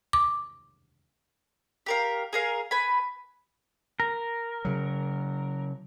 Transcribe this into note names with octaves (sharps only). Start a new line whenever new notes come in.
D6
G4 A#4 F5
G#4 A#4 F5
B4 G#5 B5
A#4
C#3 F#3